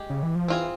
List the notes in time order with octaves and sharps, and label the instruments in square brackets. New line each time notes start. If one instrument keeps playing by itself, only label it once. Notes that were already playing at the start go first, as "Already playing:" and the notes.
Already playing: [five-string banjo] G#3 G4
[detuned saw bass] C#3
E3
F3
[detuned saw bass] E3 [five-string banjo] C4 F4 G#4